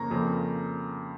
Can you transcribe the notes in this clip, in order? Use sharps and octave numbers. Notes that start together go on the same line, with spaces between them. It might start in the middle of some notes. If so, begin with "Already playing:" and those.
Already playing: F2 C#3 A#3 A#5 C#6
F2 C#3 A#3